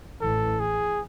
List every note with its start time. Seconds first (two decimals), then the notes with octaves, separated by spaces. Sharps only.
0.21 A1 A2 E3 A4
0.60 G#4